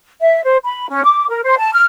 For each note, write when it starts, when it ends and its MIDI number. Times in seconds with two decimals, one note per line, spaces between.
0.21 0.43 76
0.44 0.57 72
0.64 0.89 83
0.89 1.02 61
1.03 1.25 86
1.28 1.41 70
1.43 1.57 72
1.58 1.70 81
1.74 1.84 89